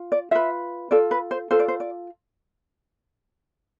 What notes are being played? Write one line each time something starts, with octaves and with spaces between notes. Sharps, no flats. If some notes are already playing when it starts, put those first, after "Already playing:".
Already playing: F4
D5
F4 B4 E5
F4 A4 D5
B4
C5
F4 A4 C5
D5
C5
D5